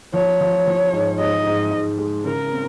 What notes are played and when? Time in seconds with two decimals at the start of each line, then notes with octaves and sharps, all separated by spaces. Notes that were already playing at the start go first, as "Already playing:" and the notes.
0.14 F3 C#5
0.41 F3
0.67 F3
0.93 G#2
1.19 G#2 D#5
1.46 G#2
1.73 G#2
1.98 G#3
2.25 C#3 A#4
2.52 C4